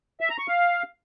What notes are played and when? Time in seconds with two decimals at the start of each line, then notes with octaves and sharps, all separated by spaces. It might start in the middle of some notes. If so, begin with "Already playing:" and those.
0.21 E5
0.30 A#5
0.39 C#6
0.48 F5